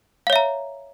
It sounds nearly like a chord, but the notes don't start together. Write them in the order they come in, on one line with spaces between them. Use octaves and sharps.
F5 C#5 E5 A#5